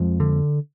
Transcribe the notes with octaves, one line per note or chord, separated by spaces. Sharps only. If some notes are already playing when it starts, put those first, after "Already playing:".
Already playing: F2 F3 G#3
D3